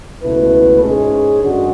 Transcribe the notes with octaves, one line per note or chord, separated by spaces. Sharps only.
C#2 B2 A3 E4 B4
G#2 G#3 C#4 G#4
F#2 D3 G#3 D4 F#4